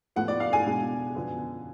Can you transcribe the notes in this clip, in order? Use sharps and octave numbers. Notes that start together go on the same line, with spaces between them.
A2 F3 B3 F#5
D5
F5
G#5
B2 G#3 D4
F#2 D3 F3 B3